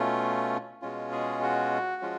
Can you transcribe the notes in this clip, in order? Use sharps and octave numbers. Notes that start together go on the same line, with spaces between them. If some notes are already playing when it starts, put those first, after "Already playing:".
Already playing: B2 A3 C#4 F4
B2 G#3 C#4 F4
G#4
F#4
F3 G#3 C#4 F4